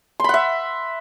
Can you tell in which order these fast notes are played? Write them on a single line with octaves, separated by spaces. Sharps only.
C6 B5 F#5 E5